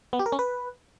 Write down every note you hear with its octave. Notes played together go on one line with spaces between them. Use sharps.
B3
G4
A#4
C#4
B4